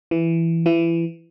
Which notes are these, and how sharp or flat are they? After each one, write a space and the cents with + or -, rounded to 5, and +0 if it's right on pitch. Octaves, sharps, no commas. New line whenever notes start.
E3 +10
E3 +25